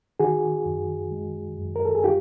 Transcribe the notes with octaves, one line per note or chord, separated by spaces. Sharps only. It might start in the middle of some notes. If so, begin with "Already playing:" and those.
D#3 F#4 G#4
F#2
G#3
F#2
A#4
A4
G#4
G3 F4 G4